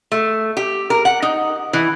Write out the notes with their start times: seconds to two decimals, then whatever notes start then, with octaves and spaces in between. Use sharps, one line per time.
0.12 A3
0.57 G4
0.90 A#4
1.05 F#5
1.22 D#4
1.73 E3